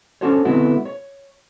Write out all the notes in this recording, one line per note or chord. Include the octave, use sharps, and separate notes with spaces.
C#4 D4 F#4 A4 C5 C#5
D3 G#3 B3 C4 E4 F#4
C#5